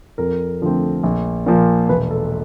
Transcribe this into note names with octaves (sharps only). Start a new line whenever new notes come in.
F2 A#4
D3 F3 A3 C4
A#1
A#2 F3 A#3
E1 B4
A4